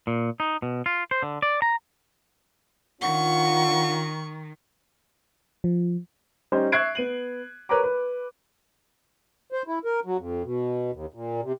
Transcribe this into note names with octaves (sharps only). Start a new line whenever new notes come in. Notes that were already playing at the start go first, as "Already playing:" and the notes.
A#2
D#4
B2
F4
C5
D3
D5
A#5
D#3 C#4 D4 F4 F#5 C#6
F3
G3 C#4 D#4 C5
E5 C#6 F#6 G#6 C7 D7
B3 D#7 F#7
A#4 B4 C#5 A#5 B5 D6
B4
C5
E4
A#4
F#3
F2
B2
D#2
A#2
C3